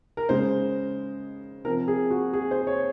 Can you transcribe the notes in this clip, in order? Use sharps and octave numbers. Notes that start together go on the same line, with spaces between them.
A#4
C#3 G#3 C#4 C5
C3 F3 C4 A#4
G#4
F#4
G#4
C5
C#5